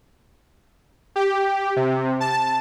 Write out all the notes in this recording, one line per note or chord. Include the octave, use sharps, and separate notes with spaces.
G4
C3
A5